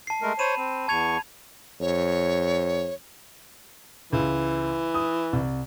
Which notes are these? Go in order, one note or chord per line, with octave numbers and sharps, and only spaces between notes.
A5 C7
G#3 A3 A#4
C5 C#5 B5 D#7 E7
C4
E2 A5 C#6 G#6 F7
F2 C#5
C#2 E3
D#6
C2